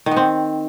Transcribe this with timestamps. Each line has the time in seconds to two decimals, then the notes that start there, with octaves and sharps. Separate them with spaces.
0.06 D#3
0.11 B3
0.16 C4